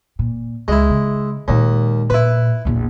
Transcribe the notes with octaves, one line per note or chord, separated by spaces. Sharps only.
A#2
C#2 G#3 E4
C#3
D#2 A#2 G#3
A#2 E4 B4
A#1 E2